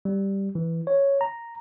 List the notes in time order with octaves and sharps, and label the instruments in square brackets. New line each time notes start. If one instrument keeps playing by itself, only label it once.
[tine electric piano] G3
E3
C#5
A#5